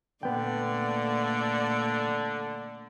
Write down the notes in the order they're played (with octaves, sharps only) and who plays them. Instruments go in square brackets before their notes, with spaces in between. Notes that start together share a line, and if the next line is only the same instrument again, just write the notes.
[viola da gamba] A#2 A3 D5 [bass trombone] D3 [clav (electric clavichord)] B3 G5